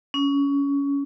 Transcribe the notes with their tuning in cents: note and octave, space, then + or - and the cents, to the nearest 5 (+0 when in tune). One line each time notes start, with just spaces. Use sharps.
C#4 +20